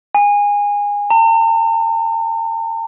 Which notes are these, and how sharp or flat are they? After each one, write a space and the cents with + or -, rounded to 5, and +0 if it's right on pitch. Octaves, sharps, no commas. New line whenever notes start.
G#5 -20
A#5 -45